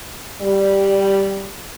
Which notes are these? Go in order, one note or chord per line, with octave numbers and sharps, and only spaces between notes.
G3